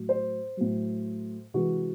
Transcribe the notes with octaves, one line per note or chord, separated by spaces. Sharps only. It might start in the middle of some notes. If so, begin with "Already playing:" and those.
Already playing: A2 F#3
C5
A2 F#3
C3 E3 G#3 F#4